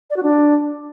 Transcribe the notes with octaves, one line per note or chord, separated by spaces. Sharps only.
D5
F#4
D4